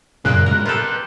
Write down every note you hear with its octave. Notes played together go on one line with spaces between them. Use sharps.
F#2 A#2 C#3 A#3 F#6
G#2 B2 A#4
F4 G4 A4 B4 A#5